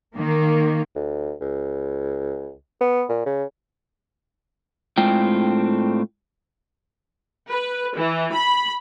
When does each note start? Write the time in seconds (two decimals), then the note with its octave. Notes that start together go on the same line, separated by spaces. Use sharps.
0.14 D#3 A#3
0.95 D2
1.41 C#2
2.81 B3
3.09 A#2
3.26 C#3
4.97 A2 G#3 C4 D4 F4 G5
7.48 B4
7.96 E3
8.32 B5